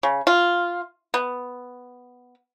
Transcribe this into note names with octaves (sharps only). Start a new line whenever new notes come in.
C#3
F4
B3